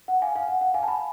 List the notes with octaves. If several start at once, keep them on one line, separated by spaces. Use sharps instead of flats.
F#5
F5 G#5
F5 G#5
F#5
F#5
F5 G#5
A5
G#5 B5